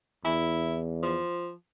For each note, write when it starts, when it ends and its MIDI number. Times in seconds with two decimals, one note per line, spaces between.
0.25 1.19 40
0.25 0.79 64
1.03 1.51 53